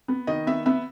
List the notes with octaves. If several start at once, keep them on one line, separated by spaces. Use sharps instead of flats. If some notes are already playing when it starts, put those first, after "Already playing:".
B3
D#3 D#5
B3 E5
B3 E5